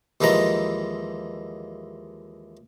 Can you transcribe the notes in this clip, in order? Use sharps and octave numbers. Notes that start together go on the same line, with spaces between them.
D#2 E3 F3 G#3 A#5